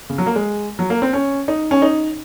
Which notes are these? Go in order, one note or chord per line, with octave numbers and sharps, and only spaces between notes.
C#3
F#3
A#3
G#3
F#3
A#3
C4
C#4
D#4
C#4
D#4